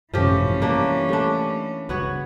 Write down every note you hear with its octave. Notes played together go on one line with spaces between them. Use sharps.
G#1 F#2 A2 C3 E3 F3 C#4 G4
G2 G3 A#3 B3 D4 G4
G3 A3 D4
C#2 G2 B3 F#4 C#5